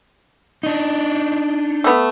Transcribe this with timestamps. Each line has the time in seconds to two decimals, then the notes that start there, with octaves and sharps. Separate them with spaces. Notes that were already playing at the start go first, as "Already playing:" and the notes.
0.63 D4 D#4
1.84 A3 B3